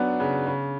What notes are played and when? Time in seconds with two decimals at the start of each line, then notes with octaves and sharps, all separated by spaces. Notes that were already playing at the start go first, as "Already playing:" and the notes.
Already playing: F#3 B3 D4
0.20 C#3
0.47 C#3